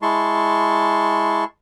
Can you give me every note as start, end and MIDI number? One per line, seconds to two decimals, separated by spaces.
0.02 1.44 56
0.02 1.44 64
0.02 1.44 81
0.02 1.44 84
0.02 1.44 85